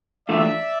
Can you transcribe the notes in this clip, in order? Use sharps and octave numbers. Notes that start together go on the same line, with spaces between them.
E3 A3 D4 F4 D5 E5